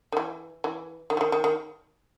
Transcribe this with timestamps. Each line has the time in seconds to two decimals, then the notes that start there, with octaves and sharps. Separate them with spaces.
0.12 D#3
0.17 E3
0.64 E3
1.10 D#3
1.17 E3
1.21 D#3
1.32 D#3
1.44 D#3